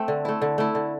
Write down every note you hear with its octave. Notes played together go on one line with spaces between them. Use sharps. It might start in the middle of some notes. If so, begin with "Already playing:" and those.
Already playing: A3 C4
D3
A3 E4
D3
A3 E4
D3